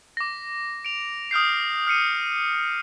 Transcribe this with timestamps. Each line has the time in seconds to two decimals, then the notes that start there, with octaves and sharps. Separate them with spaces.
0.17 D6 A#6
0.85 D7 F7
1.31 D#6 F6 G6 C7
1.87 F6 C7 C#7 D#7